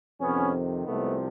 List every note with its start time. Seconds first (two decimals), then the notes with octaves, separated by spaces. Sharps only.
0.20 F2 C3 D#3 B3 C#4
0.87 C2 C3 F3 G#3 A3 B3